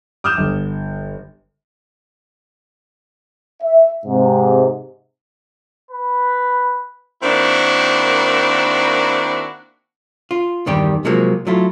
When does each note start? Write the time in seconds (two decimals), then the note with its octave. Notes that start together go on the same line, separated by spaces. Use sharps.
0.24 D6 D#6 F6 G6 E7
0.37 G1
3.63 E5
4.06 G#2 C3
5.91 B4
7.23 D#3 A#3 C4 D4 E4 F#4
10.31 F4
10.66 E2 G2 D#3 G3 G4
11.05 C3 F3 F#3 G#3 A#3
11.47 F#3 A3 E4 F4